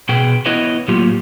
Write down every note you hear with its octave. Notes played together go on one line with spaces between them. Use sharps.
B2 G#4 B4 G5
B3 E4 B4 C#5 D#5 E5
A2 F#3 A#3 F4 G4